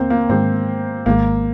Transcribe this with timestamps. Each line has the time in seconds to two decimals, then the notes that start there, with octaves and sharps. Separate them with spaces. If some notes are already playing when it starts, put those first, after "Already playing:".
Already playing: D#2 D3 A#3 C4
0.10 A#3
0.29 G#2 D#3 G#3 C4
1.06 G#1 G#2 D#3 G#3 A#3